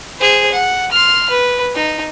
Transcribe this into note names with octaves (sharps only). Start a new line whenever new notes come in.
G#4 C5
F#5
C6 F6
B4
D#4